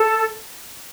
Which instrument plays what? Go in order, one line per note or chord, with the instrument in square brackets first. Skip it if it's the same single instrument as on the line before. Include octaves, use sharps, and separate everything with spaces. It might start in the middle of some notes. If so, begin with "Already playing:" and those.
Already playing: [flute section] A4